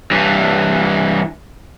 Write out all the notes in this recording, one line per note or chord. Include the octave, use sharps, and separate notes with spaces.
G2 E3